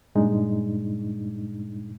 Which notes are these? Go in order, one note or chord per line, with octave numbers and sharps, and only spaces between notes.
G2 A#2 G#3 D4 D#4